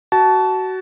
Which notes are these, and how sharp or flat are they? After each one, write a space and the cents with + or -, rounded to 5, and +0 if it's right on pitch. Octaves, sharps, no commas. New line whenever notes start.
F#4 +20 A5 -15